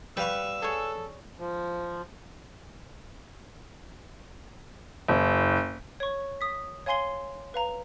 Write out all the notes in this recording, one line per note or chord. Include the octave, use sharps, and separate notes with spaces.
G3 B4 F5 C#6 E6
G#4 A4 C#5
F3
F#1
C#5 C#6
D#6 B6
C#5 F5 G#5 C6 C7 G7
B4 F5 A#5